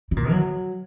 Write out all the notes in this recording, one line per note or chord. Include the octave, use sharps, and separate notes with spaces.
C#3
A#2
F#3